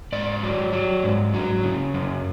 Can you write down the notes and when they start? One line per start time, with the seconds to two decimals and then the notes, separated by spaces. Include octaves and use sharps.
0.12 G#2 D5
0.43 F#3
0.73 F#3
1.04 G#2
1.34 F#3
1.64 C#3
1.94 F#2